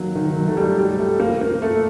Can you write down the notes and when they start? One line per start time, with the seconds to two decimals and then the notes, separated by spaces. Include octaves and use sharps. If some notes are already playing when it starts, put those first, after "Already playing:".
Already playing: D#3 F#3 A#3
0.15 D#3
0.36 F#3
0.47 A3
0.57 G3
0.78 G3
0.99 A3
1.20 A#3
1.41 A#3
1.62 A3